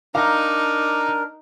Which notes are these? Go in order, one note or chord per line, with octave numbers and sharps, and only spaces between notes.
D4 D#4 A#4 F5 D6